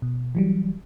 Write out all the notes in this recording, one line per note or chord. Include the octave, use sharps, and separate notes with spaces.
B2
E3 F#3 G3